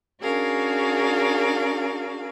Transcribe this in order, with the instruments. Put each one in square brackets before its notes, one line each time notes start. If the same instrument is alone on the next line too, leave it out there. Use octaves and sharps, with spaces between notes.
[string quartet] C#4 D4 F#4 G#4 A#4 F5